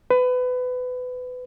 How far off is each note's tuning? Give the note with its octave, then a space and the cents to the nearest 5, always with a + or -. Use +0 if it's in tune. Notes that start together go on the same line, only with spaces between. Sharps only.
B4 +25